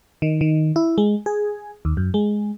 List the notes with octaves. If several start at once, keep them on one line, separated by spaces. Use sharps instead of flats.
D#3
D#3
E4
G#3
G#4
D#2
F#2
G#3